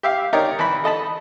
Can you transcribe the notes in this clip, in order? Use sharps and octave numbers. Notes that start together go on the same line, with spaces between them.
G4 E5 F5
D#4 G4 A#4 C#5 D5
E3 A5 B5
A4 D#5 A5 B5